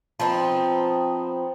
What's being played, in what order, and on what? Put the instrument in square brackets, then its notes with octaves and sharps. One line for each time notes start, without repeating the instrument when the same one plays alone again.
[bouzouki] F3 B3 C4 D#4